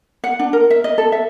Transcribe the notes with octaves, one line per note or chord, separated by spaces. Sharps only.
F#5
D4
A#4
E5
D#5
A4
E5